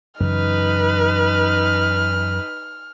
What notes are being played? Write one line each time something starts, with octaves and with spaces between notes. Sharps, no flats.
F#2 C#3 E3 D#4 B4 F6